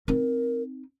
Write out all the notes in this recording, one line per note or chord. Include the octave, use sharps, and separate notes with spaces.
C4 D#4 A#4